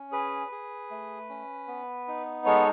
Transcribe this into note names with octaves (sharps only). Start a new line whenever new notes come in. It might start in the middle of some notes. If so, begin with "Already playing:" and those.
Already playing: C#4
G#4 B4
G#4
A3
C#4
B3
D#4
G#3 A4 C#5